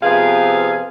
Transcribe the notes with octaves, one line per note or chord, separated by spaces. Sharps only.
F2 C3 B3 G#4 F5